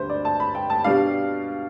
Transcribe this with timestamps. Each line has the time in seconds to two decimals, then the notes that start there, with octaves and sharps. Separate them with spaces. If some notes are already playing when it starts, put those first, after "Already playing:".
Already playing: D2 D3 G3 B4 C5
0.10 D5
0.25 A5
0.40 B5
0.55 G5
0.70 A5
0.84 B2 G3 D4 F5